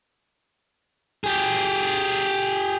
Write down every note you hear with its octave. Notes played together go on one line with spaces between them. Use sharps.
G4 G#4